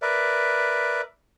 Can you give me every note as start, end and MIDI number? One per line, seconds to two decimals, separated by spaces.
0.02 1.01 70
0.02 1.01 71
0.02 1.01 74
0.02 1.01 76